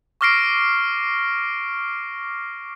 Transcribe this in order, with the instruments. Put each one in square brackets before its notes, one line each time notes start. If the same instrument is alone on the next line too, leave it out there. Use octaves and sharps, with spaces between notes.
[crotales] C#6 D6 F6 A#6 C7 D7